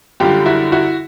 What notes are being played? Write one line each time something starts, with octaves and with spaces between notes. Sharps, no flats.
F#2 D3 G3 F4 G4
E4 F#4
E4 F#4